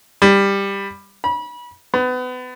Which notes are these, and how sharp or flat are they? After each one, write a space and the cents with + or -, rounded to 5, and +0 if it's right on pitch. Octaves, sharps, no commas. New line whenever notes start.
G3 +15
B5 -30
B3 +30